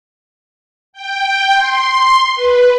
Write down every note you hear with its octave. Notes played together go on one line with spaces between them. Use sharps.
G5
C6
B4